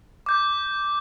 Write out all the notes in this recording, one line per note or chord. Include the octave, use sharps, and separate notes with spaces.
D6 G6